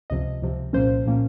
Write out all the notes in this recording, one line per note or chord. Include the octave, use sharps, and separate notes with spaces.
C#2 C3 F3 D#5
C#2 C3 F3
C2 A#2 F3 A#3 C#4 C5
A#2 F3 A#3 C#4